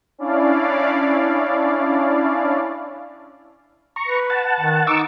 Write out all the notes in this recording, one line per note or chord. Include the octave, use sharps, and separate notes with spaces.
C#4 D4 E4 D5 F5
A#5 C#6
B4
F#5 A5
D#3
D#4 C#6 D6 E6